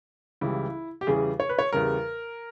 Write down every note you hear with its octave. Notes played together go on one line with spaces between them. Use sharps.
C#2 C#3 E3 G3 E4
G4
E2 C#3 E3 G3 G#4
C#5
B4
C#5
E2 C#3 G3 A#4